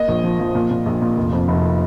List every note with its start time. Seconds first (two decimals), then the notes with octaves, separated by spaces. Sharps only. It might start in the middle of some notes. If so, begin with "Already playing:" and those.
Already playing: A#3 D#5
0.08 A#1
0.24 F3
0.39 F3
0.55 A#2
0.70 A#2
0.86 A#1
1.01 A#2
1.17 F1
1.32 F2
1.48 F1